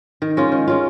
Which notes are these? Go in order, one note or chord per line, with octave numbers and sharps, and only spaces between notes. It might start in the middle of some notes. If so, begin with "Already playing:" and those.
D#3
G#3 C#4 F4
D#3
G#3 C#4 F4